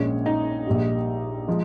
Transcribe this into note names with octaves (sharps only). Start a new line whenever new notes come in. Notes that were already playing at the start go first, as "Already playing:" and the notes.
Already playing: A#1 A#2 G#3 C#4 C#5
D#4 D#5
A#1 A#2 G3
F3 G#3